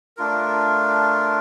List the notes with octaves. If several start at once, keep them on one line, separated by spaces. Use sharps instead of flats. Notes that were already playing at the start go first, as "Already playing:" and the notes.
A3 D4 F4 A#4